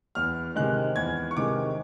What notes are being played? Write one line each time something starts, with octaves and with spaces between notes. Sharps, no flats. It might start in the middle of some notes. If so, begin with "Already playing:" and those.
E2 F6
C3 D#3 G#3 F#6
E2 G#6
C#6
C3 D#3 G#3 D6